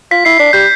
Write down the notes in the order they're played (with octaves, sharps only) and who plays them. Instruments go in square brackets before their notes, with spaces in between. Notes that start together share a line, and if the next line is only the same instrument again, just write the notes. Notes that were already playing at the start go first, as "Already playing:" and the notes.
[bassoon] F4 [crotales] B6
[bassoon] E4 [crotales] C7
[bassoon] D4 [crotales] B6
[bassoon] G3 [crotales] G6